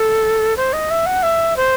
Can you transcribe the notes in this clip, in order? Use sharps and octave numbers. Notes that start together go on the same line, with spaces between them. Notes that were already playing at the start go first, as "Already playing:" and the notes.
Already playing: A4
C5
D#5
E5
F#5
E5
C5